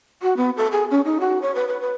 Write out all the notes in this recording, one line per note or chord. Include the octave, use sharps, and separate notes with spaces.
F#4
B3
A4
G#4
C#4
D#4
F#4
C#5
B4
B4
B4